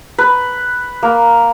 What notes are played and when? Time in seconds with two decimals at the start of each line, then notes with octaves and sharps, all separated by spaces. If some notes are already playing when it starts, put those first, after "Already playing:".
0.18 B4
1.03 A#3